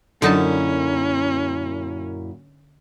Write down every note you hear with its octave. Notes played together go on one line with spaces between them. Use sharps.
F#2 A#2 D3 C#4 D#4 E4 A5